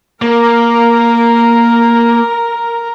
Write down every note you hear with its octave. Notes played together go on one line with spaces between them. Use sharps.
A#3 A#4